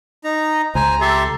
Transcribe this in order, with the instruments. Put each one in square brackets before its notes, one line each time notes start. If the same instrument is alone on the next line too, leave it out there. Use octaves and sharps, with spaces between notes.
[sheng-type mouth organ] D#4 A#5
[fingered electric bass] C#2 [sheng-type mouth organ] C5 G#5 [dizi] A#5
[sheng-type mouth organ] G4 E5 C6 [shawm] A4